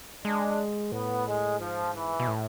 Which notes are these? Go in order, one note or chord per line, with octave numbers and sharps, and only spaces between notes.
G#3 D4
A2 B3
G#3
G#2 F3
E3
B2
A2